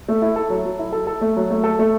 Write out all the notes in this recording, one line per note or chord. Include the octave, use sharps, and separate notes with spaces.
A3
E4
A4
F#3
F#3
E4
A4
A4
A3
F#3
A3
A4
A3